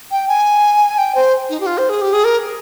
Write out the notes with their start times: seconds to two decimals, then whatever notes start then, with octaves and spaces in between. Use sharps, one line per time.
0.11 G5
0.28 G#5
0.98 G5
1.15 C5
1.50 D#4
1.60 G4
1.66 F4
1.78 C5
1.89 G#4
2.02 G4
2.13 G#4
2.24 A#4